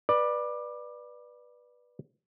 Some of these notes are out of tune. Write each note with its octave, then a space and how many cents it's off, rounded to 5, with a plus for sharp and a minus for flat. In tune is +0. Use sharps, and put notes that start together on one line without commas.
B4 -15 D5 +15